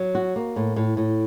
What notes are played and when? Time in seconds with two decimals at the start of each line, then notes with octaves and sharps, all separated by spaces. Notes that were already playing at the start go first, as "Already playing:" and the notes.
Already playing: F#3
0.15 F#4
0.36 A#3
0.56 A2
0.76 A2
0.97 A2